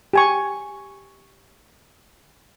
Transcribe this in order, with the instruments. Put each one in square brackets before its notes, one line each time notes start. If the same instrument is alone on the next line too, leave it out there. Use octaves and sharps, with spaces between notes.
[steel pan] G4 G#5 C#6